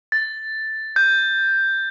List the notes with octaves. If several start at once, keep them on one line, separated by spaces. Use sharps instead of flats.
A6
G6